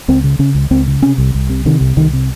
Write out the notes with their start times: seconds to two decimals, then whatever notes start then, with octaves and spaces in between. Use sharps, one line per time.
0.08 C#2 C4
0.24 C#3
0.39 C#3 C#4
0.55 C#2
0.71 C#2 C4
0.87 C#3
1.02 C3 C#4
1.18 C2
1.35 C2
1.50 C3
1.65 C3 D#3
1.81 C2
1.97 C2 D#3
2.13 C3